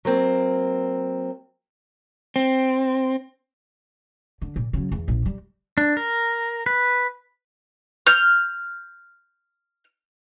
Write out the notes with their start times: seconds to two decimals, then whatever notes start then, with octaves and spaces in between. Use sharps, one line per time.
0.05 F#3 A#3 C4
2.36 C4
4.42 D3
4.56 A#2
4.73 C#3 F#3
4.92 E2
5.08 A#1
5.26 G3
5.78 D4
5.97 A#4
6.66 B4
8.07 F6 G6